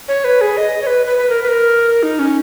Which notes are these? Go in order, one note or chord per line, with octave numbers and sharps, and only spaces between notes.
C#5
B4
G#4
D#5
C#5
B4
B4
B4
A#4
B4
A#4
D#4
C#4